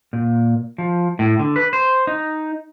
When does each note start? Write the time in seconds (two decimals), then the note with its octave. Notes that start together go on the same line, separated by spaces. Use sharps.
0.13 A#2
0.78 F3
1.19 A2
1.39 D3
1.56 B4
1.73 C5
2.07 D#4